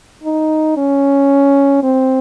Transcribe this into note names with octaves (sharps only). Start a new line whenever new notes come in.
D#4
C#4
C4